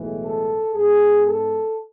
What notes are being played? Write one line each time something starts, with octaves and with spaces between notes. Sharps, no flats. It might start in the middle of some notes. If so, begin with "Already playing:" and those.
Already playing: B1 A2 E3 G#3
A4
G#2 G#3 B3 G#4
A4